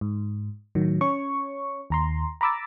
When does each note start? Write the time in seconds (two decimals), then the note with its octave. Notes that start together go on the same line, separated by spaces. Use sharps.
0.01 G#2
0.75 A2 D#3 F#3
1.01 C#4 C#5 C#6
1.90 D#2 A#5 C6
2.41 A#5 B5 D6 E6 A6